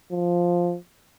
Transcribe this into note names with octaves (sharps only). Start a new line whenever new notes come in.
F3